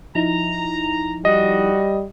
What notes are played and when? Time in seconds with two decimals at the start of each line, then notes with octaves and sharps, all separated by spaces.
0.15 F3 D#4 E4 A#5
1.25 G3 F#4 D#5